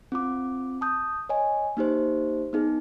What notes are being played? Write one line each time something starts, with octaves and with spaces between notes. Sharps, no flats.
C4 F4 D6
A5 D#6 G6
C#5 D#5 G#5
A#3 D#4 G4 C5
B3 D#4 G#4